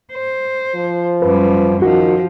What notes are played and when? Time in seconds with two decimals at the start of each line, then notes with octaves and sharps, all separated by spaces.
0.13 C5
0.75 F3
1.22 F#2 G3 B4
1.82 D#3 F3 F#4